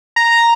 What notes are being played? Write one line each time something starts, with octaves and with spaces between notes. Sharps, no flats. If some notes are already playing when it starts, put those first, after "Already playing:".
A#5